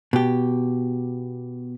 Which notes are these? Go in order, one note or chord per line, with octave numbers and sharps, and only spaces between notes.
B2 G4